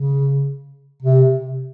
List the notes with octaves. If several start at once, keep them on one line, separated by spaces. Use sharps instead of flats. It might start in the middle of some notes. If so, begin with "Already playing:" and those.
Already playing: C#3
C3